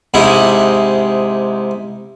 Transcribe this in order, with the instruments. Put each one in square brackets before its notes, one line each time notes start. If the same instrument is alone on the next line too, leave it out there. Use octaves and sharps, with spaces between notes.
[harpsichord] G#2 C3 D#4 E4